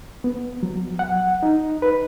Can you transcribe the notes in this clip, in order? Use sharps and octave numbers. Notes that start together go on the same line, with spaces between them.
B3
F#3
F#5
D#4
B4